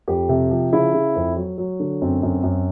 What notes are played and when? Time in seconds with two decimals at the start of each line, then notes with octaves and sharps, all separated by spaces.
0.08 F2 G4
0.29 C3
0.50 F3
0.72 C#3 E4
0.94 C#3
1.16 F2
1.36 F#3
1.58 F#3
1.80 D3
2.02 F#2 C4
2.23 F#2
2.43 F#2